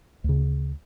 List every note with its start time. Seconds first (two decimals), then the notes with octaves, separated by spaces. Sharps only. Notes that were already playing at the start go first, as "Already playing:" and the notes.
0.24 D2 C#3